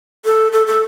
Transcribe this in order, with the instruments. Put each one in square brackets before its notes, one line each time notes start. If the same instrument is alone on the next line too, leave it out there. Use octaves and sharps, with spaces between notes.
[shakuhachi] A4
A4
A4